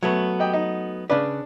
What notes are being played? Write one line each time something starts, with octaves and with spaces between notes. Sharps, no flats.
F#3 A3 B3
G4 D#5 G5
D#4
C#3 D4 B4 D5